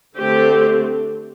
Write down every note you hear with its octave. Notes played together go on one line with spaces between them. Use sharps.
D3 A3 C4 G4